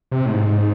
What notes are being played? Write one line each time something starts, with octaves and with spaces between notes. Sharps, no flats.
C3
A2
G#2